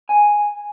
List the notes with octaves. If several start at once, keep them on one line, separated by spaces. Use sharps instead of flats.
G#5